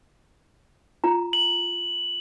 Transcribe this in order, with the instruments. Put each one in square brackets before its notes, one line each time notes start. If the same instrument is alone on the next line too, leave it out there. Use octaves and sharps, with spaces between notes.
[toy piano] F4 A#5
[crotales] F#7